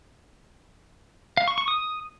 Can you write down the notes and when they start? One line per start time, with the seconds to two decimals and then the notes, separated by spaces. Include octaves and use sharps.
1.37 F5
1.48 C#6
1.58 C#6
1.68 D#6